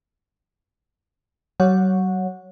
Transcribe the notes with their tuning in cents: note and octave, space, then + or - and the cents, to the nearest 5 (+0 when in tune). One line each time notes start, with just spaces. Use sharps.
F#3 +40 C#5 +0 F#5 -20